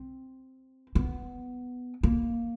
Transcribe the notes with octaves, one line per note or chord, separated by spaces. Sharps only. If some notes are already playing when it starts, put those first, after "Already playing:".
Already playing: C4
B3
A#3